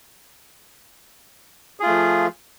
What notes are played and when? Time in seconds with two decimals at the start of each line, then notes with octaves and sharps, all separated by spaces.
1.80 G#4
1.83 F4
1.86 A3
1.90 F3